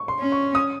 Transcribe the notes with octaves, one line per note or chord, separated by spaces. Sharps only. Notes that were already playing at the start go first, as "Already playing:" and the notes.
Already playing: C#6
C6
C#4
C#6
D#6